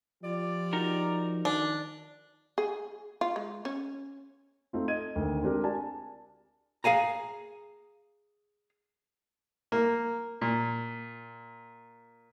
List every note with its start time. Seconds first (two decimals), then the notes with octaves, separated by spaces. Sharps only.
0.23 F3 F4 G4 D5
0.73 D#4 F#4 A#4
1.45 D#3 D4
2.58 G#4
3.21 F4
3.36 G#3
3.65 C#4
4.73 A3 C4 D#4 F4
4.88 D#5 G#6 D#7
5.15 D2 D#3
5.42 G#3 C4 D4 G4 A#4
5.64 G4 D5 G#5 A5
6.84 G#4 F5 G#5 A#5
9.72 A#3
10.41 A#2